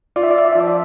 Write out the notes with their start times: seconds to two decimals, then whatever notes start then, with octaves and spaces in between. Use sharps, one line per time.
0.16 F4 D5
0.23 E5
0.31 D5
0.38 E5
0.45 D5
0.53 F3 E5
0.60 D5
0.68 E5